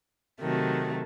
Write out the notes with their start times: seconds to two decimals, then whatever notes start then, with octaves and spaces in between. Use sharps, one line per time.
0.41 C3 D#3 F#3 A3